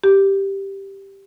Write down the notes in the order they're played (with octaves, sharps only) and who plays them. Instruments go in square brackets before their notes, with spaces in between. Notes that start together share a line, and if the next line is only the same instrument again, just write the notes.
[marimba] G4